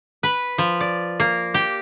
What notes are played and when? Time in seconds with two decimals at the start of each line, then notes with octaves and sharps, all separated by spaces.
0.23 B4
0.58 F3
0.80 D5
1.20 A#3
1.54 G4